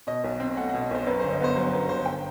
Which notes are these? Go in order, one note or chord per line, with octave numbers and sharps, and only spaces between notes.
B2 D#5
B1
C4
A3 F#5
B2 F#5
D#5
B1 C5
F#2 B4
G1 C5
D#5
B3 C5
F#3 C5
F#2 B4
G1 C5
G5